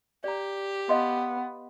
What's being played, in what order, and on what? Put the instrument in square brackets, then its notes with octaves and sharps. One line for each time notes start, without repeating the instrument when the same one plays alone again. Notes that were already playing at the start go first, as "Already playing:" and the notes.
[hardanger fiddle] G4 [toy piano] D5 A#5
[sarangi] B3 [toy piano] D#5 F5 C6